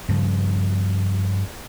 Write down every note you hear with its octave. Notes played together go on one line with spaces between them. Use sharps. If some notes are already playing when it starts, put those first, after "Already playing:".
G2 C#3 F3